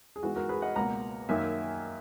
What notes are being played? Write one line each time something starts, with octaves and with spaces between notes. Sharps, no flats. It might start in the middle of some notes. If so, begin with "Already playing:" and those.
G#4
G#2 E3 G#3 B3 F#4
F#4 A#4
G#4 B4
D#5 F#5
C#2 B2 A#3 F#5 A#5
F#2 D#3 A#3 E5 G#5